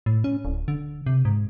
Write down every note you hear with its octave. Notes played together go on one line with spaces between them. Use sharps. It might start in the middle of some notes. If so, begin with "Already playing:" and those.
A2
C#4
D1
D3
C3
G#2